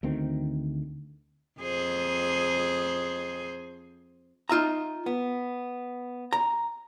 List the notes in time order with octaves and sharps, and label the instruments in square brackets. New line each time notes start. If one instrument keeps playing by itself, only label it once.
[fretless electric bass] D2 D3 D#3 C4
[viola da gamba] F2 G#4 C5
[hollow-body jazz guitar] D#4 F4 E5 A#5
B3
A#5